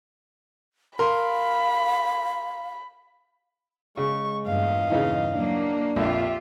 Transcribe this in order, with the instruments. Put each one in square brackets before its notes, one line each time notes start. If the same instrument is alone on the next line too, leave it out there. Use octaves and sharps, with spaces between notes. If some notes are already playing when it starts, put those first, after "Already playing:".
[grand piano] A#4 C6 [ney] F5 [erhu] B5
[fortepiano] C#3 [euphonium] G#3 [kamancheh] C#6
[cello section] E2 G2 A#2 [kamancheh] D#5 F5
[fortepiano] C#3 E3 D#4
[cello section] F#3 A#3 [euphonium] D4
[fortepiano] A#1 F2 [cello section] F4 G4 [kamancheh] E5